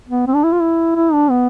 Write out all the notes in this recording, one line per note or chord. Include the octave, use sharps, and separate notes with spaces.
B3
C4
D4
E4
F4
E4
E4
D4
B3